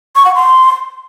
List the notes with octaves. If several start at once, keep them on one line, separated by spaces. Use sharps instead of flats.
C#6
F#5
C6